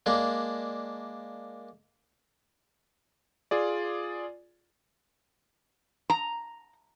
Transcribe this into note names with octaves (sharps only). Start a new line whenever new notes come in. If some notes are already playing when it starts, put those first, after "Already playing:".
G#3 A#3 D4
F4 G#4 D5
A#5